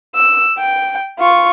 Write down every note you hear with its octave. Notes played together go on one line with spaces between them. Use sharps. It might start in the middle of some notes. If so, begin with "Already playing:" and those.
E6
G5
F4 C#6